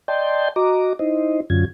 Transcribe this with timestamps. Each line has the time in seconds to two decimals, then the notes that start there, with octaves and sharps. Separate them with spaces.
0.08 D5 D#5 G5 A5 C6 G6
0.56 F#4 D#5 A#5 D6
0.99 D#4 E4 C5 D#5
1.50 F#2 D3 F#3 C#4 F4 G#6